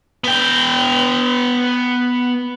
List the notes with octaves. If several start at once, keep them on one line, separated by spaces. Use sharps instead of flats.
B3 G5